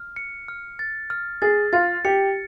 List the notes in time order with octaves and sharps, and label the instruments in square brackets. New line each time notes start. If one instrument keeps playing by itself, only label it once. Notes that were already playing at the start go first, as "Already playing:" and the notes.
Already playing: [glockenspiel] F6
C#7
F6
A6
F6
[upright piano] G#4 [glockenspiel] A6
[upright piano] F4 [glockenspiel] A6
[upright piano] G4 [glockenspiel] C#7